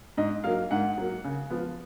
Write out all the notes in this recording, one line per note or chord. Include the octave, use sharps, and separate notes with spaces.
G#2 D#5
F#3 A#3 F5
G#2 F#5
F#3 A#3
C#3
F3 B3